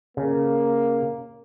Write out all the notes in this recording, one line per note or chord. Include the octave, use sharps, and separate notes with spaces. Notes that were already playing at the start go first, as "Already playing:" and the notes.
C#3 A#3